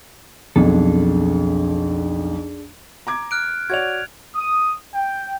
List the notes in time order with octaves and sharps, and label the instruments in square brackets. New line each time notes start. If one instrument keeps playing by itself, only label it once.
[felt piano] B1 F2 [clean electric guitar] D4 G#4 A4
[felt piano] A#5 D6 G#6
[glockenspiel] F6 F#6 D7
[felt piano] F#4 C#5 D5 [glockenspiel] G#6 F7
[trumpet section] D#6
G5